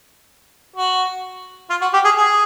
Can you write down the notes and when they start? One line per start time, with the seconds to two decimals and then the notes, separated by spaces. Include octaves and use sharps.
0.76 F#4
1.70 F4
1.81 F#4
1.93 G4
2.05 G#4
2.17 G#4